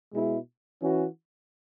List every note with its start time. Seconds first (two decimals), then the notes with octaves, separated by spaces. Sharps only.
0.12 B2 G#3 E4
0.82 E3 C#4 F#4